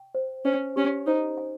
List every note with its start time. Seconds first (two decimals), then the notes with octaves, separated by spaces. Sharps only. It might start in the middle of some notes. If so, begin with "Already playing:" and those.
Already playing: G5
0.15 C5
0.45 C#4 C5
0.76 C#4 G4
1.07 D#4 C5
1.37 G#5